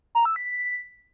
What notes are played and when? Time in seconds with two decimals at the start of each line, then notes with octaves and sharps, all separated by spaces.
0.15 A#5
0.25 E6
0.36 B6